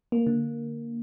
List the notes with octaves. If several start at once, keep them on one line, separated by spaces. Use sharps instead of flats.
A#3
D3